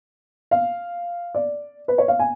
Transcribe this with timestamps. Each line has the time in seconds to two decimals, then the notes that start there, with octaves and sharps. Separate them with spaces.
0.51 F5
1.35 D5
1.88 B4
1.98 C#5
2.08 F5
2.19 G#5